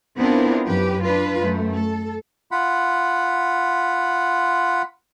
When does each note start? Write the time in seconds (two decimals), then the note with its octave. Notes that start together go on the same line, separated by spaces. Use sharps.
0.18 B3 C4 D4 E4 F4 A#4
0.67 F#2 G4 B4
1.04 D4 F4 B4
1.42 F#2 A3
1.73 A4
2.51 F4 F#5 B5